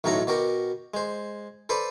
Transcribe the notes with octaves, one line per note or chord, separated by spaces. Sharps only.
B1 A2 F#3 D#4 A4 A#5
B2 F#4 G4 A#4
G#3 C5
A4 B4 C5 D5